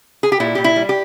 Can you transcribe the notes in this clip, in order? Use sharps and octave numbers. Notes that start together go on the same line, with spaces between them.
G#4
G4
A#2 E4
A#2 G4
E4
G3
G4